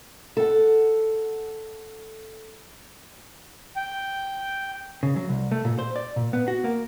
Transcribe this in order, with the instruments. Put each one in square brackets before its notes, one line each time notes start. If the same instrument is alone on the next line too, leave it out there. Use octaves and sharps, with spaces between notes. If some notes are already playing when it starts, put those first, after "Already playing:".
[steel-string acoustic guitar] A4 F#5
[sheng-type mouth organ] G5
[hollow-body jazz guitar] C#3
F#3
C2
A3
A#2
C5
D5
A#2
B3
F#4
A#3